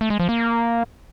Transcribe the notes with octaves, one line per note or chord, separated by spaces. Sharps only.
A3
G#3
F3
A#3